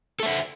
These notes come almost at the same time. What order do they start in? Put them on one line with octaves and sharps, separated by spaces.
A4 E5 C5